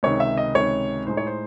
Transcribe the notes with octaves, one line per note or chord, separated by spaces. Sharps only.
C#2 C3 D#3 C#5
E5
D#5
C#2 C3 D#3 C#5
A2 G#3 D#4 C5
C#5
C5